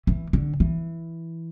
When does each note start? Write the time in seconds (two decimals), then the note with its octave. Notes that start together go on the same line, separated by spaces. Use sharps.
0.07 E3
0.33 D3
0.60 E3